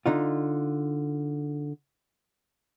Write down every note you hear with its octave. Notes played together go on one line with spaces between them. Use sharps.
D3 D#4 F4